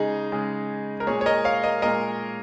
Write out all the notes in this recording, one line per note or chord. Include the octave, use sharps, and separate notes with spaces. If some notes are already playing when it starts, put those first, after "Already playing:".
Already playing: C#3 G#3 D#4 G#4
C#3 G#3
A#4
A#2 G#3 G#4 C#5
C#5
A#4 D#5
C#5 F5
A#4 D#5
A#2 G#3 A#4 D#5